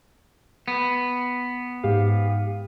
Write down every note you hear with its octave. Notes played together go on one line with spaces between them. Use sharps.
B3
G#2 G4 F5